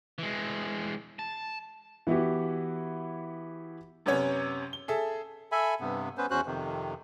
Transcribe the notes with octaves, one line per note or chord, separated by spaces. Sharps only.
E3 G#3
A5
E3 B3 E4 F#4 G4
F#2 C3 B3 C#4 C#5
G7
G#4 A4 E5
A4 E5 G#5 B5
G2 C3 B3
B3 C#4 B4 C5
E2 C#4 F#4 C5 F#6
F2 C3 D#3